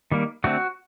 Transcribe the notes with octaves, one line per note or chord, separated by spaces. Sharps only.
D#3 G3 A#3
D3 A3 C4 F#4